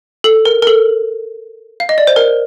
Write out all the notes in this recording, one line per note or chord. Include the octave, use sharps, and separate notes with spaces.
A4
A#4
A#4
A4
F5
D#5
D5
C5
A#4